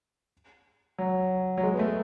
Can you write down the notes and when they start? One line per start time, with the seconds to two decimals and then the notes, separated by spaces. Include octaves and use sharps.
0.98 F#3
1.57 F#3
1.63 G#3
1.74 B3
1.79 A3